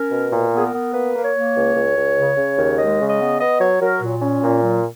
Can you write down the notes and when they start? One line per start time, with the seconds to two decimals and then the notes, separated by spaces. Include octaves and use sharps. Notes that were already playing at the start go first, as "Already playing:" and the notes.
Already playing: C#4 A#4
0.11 B2
0.32 A#2
0.52 B3
0.58 G#4
0.64 A#4
0.74 B3
0.93 A#3 B4
1.15 A#3
1.25 C#5
1.35 A#3
1.55 C#2
1.75 C#2
1.96 C#2
2.17 C#3
2.37 C#3
2.58 D#2
2.78 G#3 D#5
2.99 C#3
3.09 D#5
3.20 B3
3.41 B3 D#5
3.60 F#3 C#5
3.81 F#3 A#4
4.02 A#2
4.22 C#4
4.43 A#2
4.63 F#3